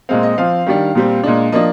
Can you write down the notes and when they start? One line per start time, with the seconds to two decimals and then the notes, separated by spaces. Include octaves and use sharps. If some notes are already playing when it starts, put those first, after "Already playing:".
0.09 A#2 G#3 C4 F5
0.23 D#5
0.38 F3 C4 F5
0.66 D#3 G3 D4
0.95 A#2 G3 C4
1.23 A#2 G#3 D4
1.52 F3 A#3 D4 D#5